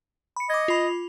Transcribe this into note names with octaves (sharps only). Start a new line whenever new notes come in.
B5 C#7
D#5 D6 G#6
F4 B5